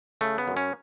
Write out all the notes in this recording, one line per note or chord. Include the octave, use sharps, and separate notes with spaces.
C#3 A3
B3
F#2
C#4